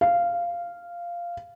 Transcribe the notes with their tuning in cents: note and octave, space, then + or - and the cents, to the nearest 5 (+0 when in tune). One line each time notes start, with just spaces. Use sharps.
F5 -10